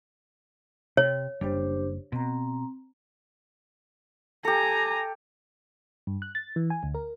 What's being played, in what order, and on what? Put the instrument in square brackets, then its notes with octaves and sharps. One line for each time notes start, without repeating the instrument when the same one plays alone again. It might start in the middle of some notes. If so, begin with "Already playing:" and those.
[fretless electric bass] C3 [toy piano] C#5
[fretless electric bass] F#1 G3 [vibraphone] D4 G4 C5
[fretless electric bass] B2 [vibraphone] C4 A#5
[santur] G4 A4 [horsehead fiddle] G#5 A#5
[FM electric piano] G2
F#6
A6
E3
G#5
D2
A#4